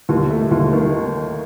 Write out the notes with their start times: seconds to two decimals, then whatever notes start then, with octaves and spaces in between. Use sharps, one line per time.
0.09 D#2
0.30 A3
0.51 D#2
0.73 D#3